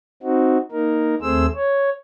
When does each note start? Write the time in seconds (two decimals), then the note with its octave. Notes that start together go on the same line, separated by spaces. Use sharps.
0.23 C4 D#4 F#4
0.72 A#3 D#4 A#4
1.22 D#2 A3 C4 G#4 C5 E6
1.55 C#5